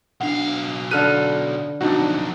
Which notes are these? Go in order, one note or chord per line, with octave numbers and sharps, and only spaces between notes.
B1 D4 F5 F#5
D3 A4 B4 F6 F#6 D#7
B1 F2 D4 D#4 F#4